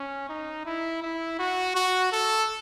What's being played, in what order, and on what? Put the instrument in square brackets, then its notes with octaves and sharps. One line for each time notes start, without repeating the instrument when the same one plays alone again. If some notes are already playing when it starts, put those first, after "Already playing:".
Already playing: [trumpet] C#4
D#4
E4
E4
F#4
F#4
A4